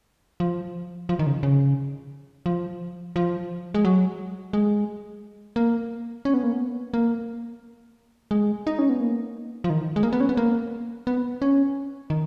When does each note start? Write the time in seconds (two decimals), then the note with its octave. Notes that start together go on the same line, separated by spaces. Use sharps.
0.40 F3
1.09 F3
1.19 D#3
1.26 C#3
1.43 C#3
2.46 F3
3.16 F3
3.74 G#3
3.85 F#3
4.53 G#3
5.56 A#3
6.25 C#4
6.34 B3
6.43 A#3
6.53 B3
6.94 A#3
8.31 G#3
8.67 D#4
8.79 C#4
8.89 B3
9.00 A#3
9.64 F3
9.70 D#3
9.96 G#3
10.03 A#3
10.13 B3
10.20 C#4
10.29 B3
10.37 A#3
11.07 B3
11.42 C#4
12.10 D#3